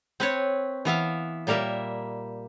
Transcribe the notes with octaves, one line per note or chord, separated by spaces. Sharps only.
C4 B4 C#5
E3 B3 E5 F5
A#2 G3 A#3 A#4 E5